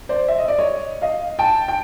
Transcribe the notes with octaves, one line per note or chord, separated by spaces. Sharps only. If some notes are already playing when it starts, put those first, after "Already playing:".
C5 D5
E5
D#5
D5
C#5 D#5
D#5 F5
G5 A5
G5